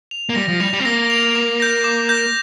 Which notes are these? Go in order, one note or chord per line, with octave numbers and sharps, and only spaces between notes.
F7
A#3
G3 A#6
F3
G3 F7
G3
C4
A#3 A#6
F7
D6
G6 A#6
D6
G6 A#6